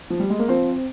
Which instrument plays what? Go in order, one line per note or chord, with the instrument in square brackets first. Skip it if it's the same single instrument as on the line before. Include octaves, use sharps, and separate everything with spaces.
[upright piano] F3
G3
G#3
A#3
[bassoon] F3 [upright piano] C4